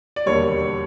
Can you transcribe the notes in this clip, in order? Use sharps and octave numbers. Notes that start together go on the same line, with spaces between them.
D5
E1 D#2 D3 G3 C#5